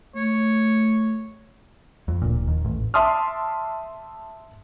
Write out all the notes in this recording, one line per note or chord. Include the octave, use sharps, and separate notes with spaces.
A3 C#5
F2
D1 A#2
D#2
A1
E5 A5 C6 D6 D#6 F6